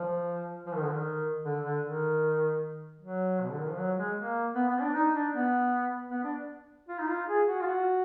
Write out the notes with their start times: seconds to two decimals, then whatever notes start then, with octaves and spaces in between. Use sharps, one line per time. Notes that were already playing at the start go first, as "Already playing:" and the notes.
Already playing: F3
0.66 F3
0.75 D#3
0.84 D3
0.92 D#3
1.44 D3
1.64 D3
1.83 D#3
3.00 F#3
3.41 B2
3.51 D3
3.59 D#3
3.69 F3
3.77 F#3
3.98 G#3
4.16 A#3
4.55 B3
4.69 B3
4.81 D4
4.94 D#4
5.14 D4
5.33 B3
6.11 B3
6.24 D4
6.88 F4
6.99 D#4
7.08 F4
7.28 G#4
7.47 F#4
7.61 F4
7.66 F#4